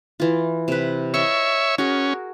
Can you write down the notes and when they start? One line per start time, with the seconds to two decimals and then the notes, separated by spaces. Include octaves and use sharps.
0.20 E3 F4
0.68 C3 B4
1.14 C#5 D#5 E5 C#6
1.78 C#4 F#4 G#4 A#4